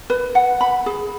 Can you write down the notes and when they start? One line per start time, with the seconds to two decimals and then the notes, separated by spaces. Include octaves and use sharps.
0.10 B4
0.35 F#5
0.61 B5
0.86 G#4